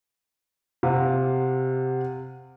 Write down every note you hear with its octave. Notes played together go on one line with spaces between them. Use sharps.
C3 F5 F#5